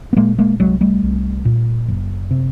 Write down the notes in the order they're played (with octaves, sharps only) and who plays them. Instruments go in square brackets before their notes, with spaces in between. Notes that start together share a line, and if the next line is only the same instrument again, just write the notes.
[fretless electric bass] B3
A#2 G#3 A#3
G#3 A#3
C2 F#3 G#3
G3 A3
C2
A#2
F#1
C3